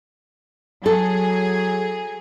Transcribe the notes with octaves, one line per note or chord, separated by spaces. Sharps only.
F#3 G#4 A4